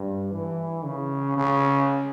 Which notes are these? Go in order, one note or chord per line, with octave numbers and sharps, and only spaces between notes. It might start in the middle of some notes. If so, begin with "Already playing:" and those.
Already playing: G2
E3
C#3
C#3